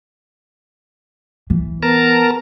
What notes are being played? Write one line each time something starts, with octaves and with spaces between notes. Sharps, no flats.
E3
B3 A#4 A5 A#5